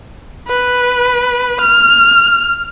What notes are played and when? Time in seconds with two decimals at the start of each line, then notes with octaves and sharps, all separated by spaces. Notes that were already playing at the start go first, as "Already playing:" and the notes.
0.48 B4
1.61 F6